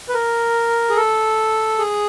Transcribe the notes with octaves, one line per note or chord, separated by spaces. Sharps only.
B4
A#4
G#4
A4
G#4